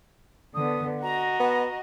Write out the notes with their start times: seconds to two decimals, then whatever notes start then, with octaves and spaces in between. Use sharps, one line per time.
0.54 D3 B3 D#6
1.03 F#4 D#5 A#5
1.40 B3